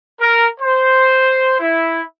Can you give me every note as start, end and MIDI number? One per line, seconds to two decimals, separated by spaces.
0.20 0.46 70
0.60 1.57 72
1.60 2.01 64